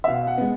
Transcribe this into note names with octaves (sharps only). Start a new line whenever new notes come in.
E5
B2 F5
F#5
G#3 B3